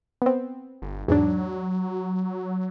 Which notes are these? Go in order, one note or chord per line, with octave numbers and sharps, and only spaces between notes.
B3 C4
G1
E2 G#2 F#3 D4